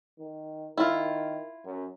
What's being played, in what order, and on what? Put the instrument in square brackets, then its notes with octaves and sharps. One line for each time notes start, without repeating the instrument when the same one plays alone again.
[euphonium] D#3
[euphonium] D#3 [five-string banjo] E4 F4
[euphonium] F#2